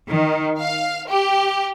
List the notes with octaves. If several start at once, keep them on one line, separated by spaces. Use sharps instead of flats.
D#3
F5
G4